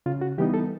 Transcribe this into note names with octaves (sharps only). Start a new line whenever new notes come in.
C#3 F4
F#4
E3 G3 B3 D#4 G4
A4